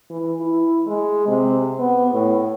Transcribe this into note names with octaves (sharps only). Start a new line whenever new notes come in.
E3
E4
G#3
C3
B3
A2